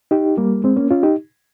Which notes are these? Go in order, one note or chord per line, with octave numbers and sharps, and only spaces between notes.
D#4 G4
G3 A#3
G#3 C4
A#3 C#4
C#4 F4
D#4 G4